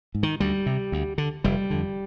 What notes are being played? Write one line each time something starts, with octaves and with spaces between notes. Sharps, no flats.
G#2
D#3
D2 G3
C3
D2
D3
F1 G3
F2 D3